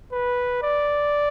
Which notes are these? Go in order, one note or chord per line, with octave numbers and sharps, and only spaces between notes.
B4
D5